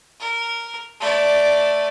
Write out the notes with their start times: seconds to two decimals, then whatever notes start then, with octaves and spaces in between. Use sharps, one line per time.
0.20 A#4
1.01 A3 D5